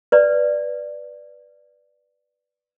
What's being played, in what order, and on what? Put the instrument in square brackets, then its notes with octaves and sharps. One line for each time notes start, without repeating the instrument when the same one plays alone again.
[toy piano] B4 D5